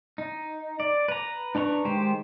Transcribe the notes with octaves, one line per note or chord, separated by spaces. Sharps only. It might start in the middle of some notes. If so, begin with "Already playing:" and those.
D#4
D5
B4 A#5
D4 B4 A#5 C6 C#6
D#3 G#3 G4 C5